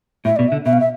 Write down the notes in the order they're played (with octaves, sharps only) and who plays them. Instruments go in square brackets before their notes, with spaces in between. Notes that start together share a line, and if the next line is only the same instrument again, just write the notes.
[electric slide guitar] A2 [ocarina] E5
[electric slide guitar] B2 [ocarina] D5
[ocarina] E5
[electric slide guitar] D3
[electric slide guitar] B2 [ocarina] E5
[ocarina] F5
E5